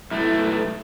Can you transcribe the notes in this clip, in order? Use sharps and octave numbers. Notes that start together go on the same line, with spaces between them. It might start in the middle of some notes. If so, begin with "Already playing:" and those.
B1 A3 E4